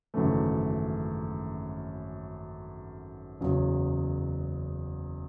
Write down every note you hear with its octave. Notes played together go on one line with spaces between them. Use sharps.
G#1 F#2 C#3 E3 A3
F#1 E2 C#3 F#3